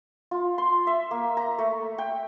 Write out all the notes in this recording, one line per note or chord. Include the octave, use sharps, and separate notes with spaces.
F4
C6
E5
A#3
A#5
A3
G5